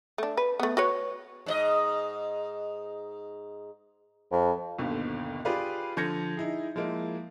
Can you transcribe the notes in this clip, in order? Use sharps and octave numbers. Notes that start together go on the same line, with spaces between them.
A3 D4
B4
A3 B3
F#4 B4 C#5
G#2 D5 D#5
F2
G1 D#2 B2 D3
F4 G4 G#4 B4 D5 F5
D3 F3 G6 G#6 A#6 C#7
D#4 E4 G#4
F3 G#3 A#3 E4